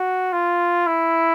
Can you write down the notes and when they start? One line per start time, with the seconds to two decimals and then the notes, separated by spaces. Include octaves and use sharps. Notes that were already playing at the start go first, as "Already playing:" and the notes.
Already playing: F#4
0.33 F4
0.87 E4